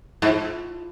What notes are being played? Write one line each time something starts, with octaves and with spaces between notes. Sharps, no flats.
G#2
F4